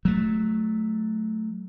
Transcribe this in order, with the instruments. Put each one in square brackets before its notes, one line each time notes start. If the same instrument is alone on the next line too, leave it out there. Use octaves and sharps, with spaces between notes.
[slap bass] F#3 A3